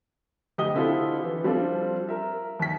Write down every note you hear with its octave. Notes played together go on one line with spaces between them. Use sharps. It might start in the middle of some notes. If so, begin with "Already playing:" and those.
D2 G4 D#5 D#6 G7
D3 C4 E4 F4 G4 A4
E3 G4
F3 G3 C4 D4 F4 A4
A#4 E5
D#2 B6